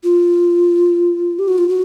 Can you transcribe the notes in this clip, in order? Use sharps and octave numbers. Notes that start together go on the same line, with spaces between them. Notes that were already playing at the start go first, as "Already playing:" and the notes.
F4
G4
F#4
F4
F#4